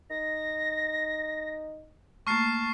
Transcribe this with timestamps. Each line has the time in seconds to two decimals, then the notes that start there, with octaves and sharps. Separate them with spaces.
0.10 D#4 A#6
2.27 A3 A#3 A5 C#6 F6 C7